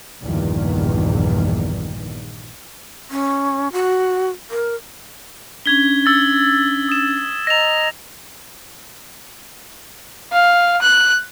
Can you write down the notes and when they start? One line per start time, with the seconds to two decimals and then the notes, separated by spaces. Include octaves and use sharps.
0.23 A#1 E2 G2 A#2 D#3
3.11 C#4
3.72 F#4
4.50 A#4
5.66 C#4 D4 G#6 B6 G7
6.06 E6 A6
6.89 D#6 E7
7.47 D#5 A#5 A#6 F7
10.32 F5
10.82 F#6